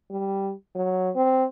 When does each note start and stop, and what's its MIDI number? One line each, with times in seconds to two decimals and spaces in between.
0.10 0.52 55
0.75 1.10 54
1.15 1.45 60